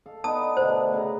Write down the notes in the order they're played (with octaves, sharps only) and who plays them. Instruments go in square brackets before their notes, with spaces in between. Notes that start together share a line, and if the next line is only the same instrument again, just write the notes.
[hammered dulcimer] A4 F5
[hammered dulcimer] B3 D4 D#4 [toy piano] A5 D#6
[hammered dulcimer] B2 D3 A3 [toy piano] C5
[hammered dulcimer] C#3 A#5